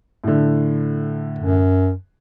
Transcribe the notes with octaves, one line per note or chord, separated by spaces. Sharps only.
A2 D3
F#2